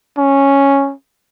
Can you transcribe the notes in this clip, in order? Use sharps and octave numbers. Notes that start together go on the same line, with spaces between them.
C#4